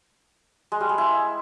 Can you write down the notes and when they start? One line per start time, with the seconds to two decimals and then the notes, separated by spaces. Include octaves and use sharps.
0.72 G#3
0.80 G3
0.89 G#3
0.98 E4